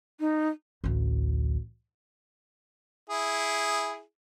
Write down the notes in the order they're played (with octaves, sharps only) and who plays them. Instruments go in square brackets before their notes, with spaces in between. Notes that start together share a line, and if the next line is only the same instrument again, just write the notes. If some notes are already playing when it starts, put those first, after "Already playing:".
[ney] D#4
[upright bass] A1 D2
[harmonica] E4 G#4